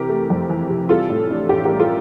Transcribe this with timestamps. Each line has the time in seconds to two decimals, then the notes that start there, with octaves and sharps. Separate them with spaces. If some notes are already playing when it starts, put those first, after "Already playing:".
Already playing: C3 E3 G4 A#4
0.09 A3
0.30 F2
0.50 E3
0.69 C3
0.89 G3 F4 A4
1.09 A2
1.30 D4
1.49 A1 G4
1.65 G3 G4 A#4
1.80 F4 A4